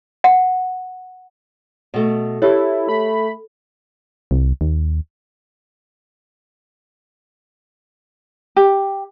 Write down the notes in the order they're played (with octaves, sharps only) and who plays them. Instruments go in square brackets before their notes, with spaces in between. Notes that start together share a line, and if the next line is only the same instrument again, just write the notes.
[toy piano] F#5
[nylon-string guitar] B2 A3
[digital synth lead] E4 [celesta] G4 C#5 [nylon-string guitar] A4
[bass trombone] A3 [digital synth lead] B5
[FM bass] C2
D#2
[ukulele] G4